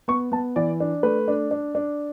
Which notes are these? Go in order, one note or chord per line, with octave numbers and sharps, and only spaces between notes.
B3 C#6
B3 A5
E3 D5
D4
A3 B4
D4
D4
D4